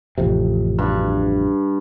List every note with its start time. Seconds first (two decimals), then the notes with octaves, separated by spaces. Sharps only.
0.18 A1 F2 C3
0.79 G2